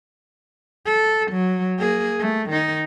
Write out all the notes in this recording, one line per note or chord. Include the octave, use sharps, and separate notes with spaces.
A4
F#3
A#3 G#4
A3
D#3 D#4